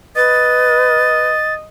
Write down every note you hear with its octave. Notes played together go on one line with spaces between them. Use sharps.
B4 D#5 A6